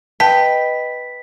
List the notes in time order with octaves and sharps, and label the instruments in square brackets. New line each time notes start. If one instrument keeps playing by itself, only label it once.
[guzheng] B4 D#5 [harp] G5 [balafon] A5 [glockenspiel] B6